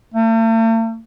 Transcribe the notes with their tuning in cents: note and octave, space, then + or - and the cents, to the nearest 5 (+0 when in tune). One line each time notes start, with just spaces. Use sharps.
A3 +45